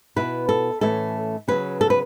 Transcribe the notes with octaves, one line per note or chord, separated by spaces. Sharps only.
B2 B3 E4 B4
A4
A2 E3 A3 C#4 E4 A4
C#3 F#3 C#4 B4
A4
B4